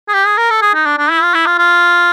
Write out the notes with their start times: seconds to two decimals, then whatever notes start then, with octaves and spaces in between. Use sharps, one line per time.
0.08 G#4
0.13 G4
0.26 G#4
0.38 A#4
0.50 A4
0.61 G#4
0.74 D#4
0.86 D4
0.98 D4
1.10 E4
1.22 F4
1.34 E4
1.46 F4
1.58 F4